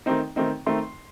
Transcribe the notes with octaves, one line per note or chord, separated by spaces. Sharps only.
D#3 A3 C4 D#4
D#3 A3 C4 D#4
D#3 A3 C4 D#4 C6